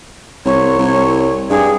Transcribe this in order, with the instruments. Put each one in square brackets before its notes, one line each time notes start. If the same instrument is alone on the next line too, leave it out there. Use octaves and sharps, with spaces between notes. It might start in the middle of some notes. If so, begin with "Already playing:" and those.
[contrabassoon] C2 [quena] C#5
[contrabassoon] C2
[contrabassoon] G2 [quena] G#4